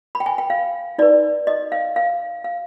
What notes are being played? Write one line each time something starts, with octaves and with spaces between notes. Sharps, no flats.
B5
G5
G#5
G5
F5
D#4 B4 D5
D#5
F5
F5
F5